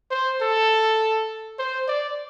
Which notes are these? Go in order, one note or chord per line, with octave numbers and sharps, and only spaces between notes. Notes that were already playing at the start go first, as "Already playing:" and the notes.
C5
A4
C5
D5